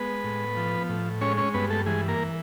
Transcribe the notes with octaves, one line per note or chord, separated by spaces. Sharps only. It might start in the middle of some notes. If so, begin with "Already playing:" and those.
Already playing: G#3 B3 B4
A2
F3
A2
G#3 C#4 C#5
C#4 C#5
G2 B3 B4
A3 A4
E3 G#3 G#4
A#3 A#4